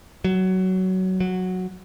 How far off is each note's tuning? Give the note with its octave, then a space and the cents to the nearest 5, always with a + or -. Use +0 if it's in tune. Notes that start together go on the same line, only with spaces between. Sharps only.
F#3 +15
F#3 -5